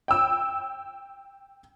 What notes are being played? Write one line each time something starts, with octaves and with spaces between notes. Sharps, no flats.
G5 E6